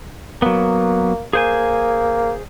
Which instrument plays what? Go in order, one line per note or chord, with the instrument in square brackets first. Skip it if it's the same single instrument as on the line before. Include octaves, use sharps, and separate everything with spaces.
[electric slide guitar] F#3 B3 [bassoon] A#3
[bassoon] A#3 [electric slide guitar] G#4 C5 G#5